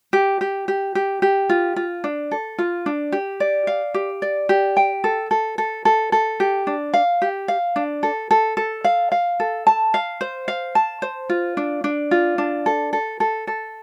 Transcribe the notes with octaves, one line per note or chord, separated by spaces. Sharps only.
G4
G4
G4
G4
G4
F4
F4
D4
A4
F4
D4
G4
D5
F5
G4
D5
G4
G5
A4
A4
A4
A4
A4
G4
D4
F5
G4
F5
D4
A4
A4
A4
F5
F5
A4
A5
F5
C5
F5
A5
C5
F4
D4
D4
F4
D4
A4
A4
A4
A4